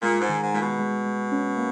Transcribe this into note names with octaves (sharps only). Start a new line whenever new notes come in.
A#2 G#3
G#2
D#3
G#2
A#2 G#3
B2
G#3
G#3
C#4
A#3